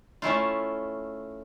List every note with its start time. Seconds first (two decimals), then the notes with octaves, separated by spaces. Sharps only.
0.22 A3 C#4 E4 F4